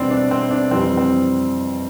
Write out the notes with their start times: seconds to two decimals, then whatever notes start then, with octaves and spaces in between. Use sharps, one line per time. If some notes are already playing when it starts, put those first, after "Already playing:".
Already playing: E2 B2 G3 C4 D4 E4
0.11 D4
0.31 C4
0.51 D4
0.71 F2 E3 G3 C4
0.97 C4